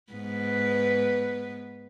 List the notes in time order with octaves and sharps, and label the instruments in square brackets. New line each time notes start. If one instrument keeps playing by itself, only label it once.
[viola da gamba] G#2 B3 B4